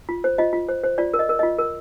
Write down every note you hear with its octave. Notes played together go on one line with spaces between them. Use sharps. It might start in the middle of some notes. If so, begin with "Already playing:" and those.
F4
C5
F4 D#5
F4
C5
C5
F4 D5
A#4
D#5
A#4
F4 D#5
A#4